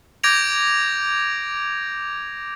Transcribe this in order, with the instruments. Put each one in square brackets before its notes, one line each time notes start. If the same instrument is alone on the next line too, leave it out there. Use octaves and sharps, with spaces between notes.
[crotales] D6 G6 G#6 A#6 D7 F7